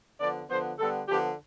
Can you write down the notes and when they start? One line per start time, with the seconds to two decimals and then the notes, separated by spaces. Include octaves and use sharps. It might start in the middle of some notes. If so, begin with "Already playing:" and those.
0.19 D3 F3 B3 D5
0.49 D3 F3 B3 C5
0.79 D3 G3 B3 A4
1.09 D3 F3 B3 G4